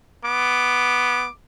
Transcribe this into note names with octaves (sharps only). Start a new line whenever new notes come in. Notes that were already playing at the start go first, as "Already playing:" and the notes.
B3 D6